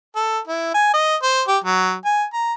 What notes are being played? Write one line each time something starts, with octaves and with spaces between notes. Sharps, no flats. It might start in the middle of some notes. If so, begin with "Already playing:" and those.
A4
E4
G#5
D#5
C5
G4
F#3
G#5
A#5